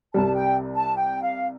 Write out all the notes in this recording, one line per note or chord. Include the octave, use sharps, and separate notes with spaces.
C2 C3 G3 A5
G5
A5
G5
F5